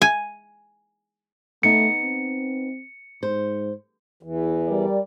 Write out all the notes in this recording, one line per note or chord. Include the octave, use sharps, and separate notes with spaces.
G#5
A3 B3 D#4 C#7
C4
G#2 C5
E2 E3
G3 A#4 D5